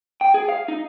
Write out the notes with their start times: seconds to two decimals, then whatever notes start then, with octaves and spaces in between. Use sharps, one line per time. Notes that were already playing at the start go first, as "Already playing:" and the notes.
0.21 G5
0.34 G#4
0.49 F5
0.68 D#4